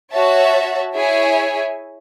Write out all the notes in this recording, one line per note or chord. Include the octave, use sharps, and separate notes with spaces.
F#4 C#5 E5 A5
E4 G#4 C#5 E5 G#5